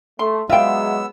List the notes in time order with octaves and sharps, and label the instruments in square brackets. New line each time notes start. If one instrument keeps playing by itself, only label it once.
[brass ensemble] A3 [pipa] C6
[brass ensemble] F#3 G#3 [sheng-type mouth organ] B3 E6 [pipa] F4 G5 [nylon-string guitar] E5 F5